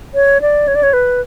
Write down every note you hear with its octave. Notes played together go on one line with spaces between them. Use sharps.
C#5
D5
C#5
D5
C#5
B4